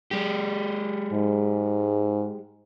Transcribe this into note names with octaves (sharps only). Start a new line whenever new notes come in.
G#3 G4
G#2